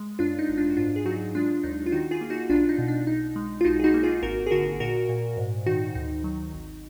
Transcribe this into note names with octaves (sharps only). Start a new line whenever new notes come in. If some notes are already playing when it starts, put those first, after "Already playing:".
Already playing: G#3
F#2 D4 F4
D#4
G#1 D#4
D4 F4
F#4
G#2 D4 F4
G#4
F#3 D#4 F#4
G#3 D4 F4
D#2 D#4
F4
D#3 D#4 F#4
F4 G#4
A#3
D#4 F#4
B1 D4 F4
D#4
B2
D4
B1 D#4
G#3
F4
B1 D#4 F#4
G#4
D#4 F#4
A#3
F4 G#4
G#1 F#4 A#4
G#4
D3 F#4 A#4
A#2 F#4 A#4
A#2
G#2
D#3 D#4 F#4
D2 D#4
F#3
G#1